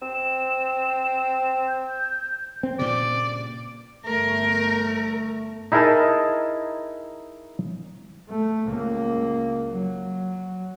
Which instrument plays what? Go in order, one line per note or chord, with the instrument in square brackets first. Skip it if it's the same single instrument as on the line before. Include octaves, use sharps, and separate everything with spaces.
[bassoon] C4 [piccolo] E7
[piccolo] G6
[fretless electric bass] C4
[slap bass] G2 A#2 C#3 [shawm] D5
[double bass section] G1 [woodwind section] A3 [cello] A#4
[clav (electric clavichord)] D#4 E4 G#4 A#4 D#5 A5
[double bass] A3
C#2 A#3
F#3